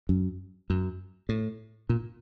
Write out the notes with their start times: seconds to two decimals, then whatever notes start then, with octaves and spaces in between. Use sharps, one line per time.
0.09 F#2
0.70 F#2
1.29 A2
1.89 A#2